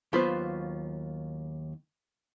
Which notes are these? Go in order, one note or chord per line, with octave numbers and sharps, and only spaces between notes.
D#2 F#3 B3 F4 B4 C5